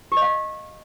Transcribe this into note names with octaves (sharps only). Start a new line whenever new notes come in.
G4
D#5
F5